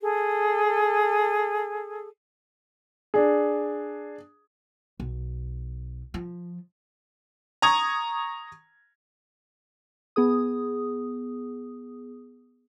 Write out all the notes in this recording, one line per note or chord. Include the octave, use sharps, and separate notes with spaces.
G#4 A4
D4 G#4
B1
F3
A#5 C#6 D#6 G#6
B3 G#4 D#6